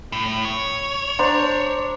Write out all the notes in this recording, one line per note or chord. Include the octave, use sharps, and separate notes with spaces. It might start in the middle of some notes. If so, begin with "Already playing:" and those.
A2
C#5
D4 C5 A#5